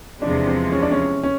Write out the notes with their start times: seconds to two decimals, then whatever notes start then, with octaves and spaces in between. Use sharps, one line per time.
0.22 E2 C3 F3 G#3 D4
0.47 C4
0.72 C#4
0.82 D4
0.92 C#4
1.23 C#4